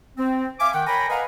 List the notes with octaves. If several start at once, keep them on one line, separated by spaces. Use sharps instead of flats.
C4
E5 F5 G#5 D6
D#3 F#5 G5
A#4 C#5 G5 G#5 A#5 B5
B4 D#5 F5 F#5 G#5 A#5